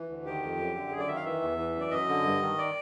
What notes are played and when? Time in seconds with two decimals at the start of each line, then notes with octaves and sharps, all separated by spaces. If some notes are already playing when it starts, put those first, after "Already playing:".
Already playing: E3
0.09 D2
0.25 D#3 G4
0.42 F2
0.59 F#2
0.75 D3
0.92 F#2 G#4
1.00 D5
1.08 D#3 E5
1.16 F5
1.25 E3 E5
1.42 E2
1.58 E3
1.75 F#2
1.80 D5
1.91 F#2 D#5
2.08 D3
2.25 G2
2.41 D#3
2.58 D5